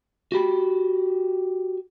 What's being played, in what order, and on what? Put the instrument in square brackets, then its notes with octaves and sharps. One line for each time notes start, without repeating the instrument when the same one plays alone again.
[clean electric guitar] F#4 G4 B5